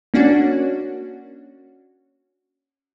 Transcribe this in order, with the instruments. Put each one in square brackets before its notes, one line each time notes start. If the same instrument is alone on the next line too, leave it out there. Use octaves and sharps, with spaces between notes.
[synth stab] A#3 C#4 D4 F#4